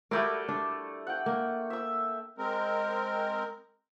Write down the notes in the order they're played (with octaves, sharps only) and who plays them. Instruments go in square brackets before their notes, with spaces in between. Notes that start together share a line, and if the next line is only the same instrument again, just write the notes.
[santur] G3 A3 D6 [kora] E4 F#4 A#4
[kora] D4
[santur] F#5 G5
[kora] A#3
[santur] E5 E6
[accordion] G#3 C4 A#4